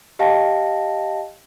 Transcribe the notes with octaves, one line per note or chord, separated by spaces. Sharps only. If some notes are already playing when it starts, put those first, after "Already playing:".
G4 D#5 F5 G5 A5 A#6